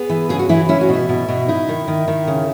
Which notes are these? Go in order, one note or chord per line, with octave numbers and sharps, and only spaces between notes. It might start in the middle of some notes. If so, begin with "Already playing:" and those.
Already playing: B3 G#4
E3
C#3 G#4
F#4
E3 E4
C#4 E4
F#4
B2 E4
B2
B2
D#4 E4
D#3
D#3
D#3
C#3